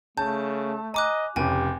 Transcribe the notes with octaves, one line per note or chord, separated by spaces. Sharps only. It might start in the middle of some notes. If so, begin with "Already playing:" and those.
C#3 A3 A5 G6
D#5 G#5 A#5 D6 F#6
F1 A2 C#3 G4 G5 G#5